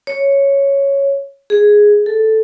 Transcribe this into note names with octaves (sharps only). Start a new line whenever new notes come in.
C#5
G#4
A4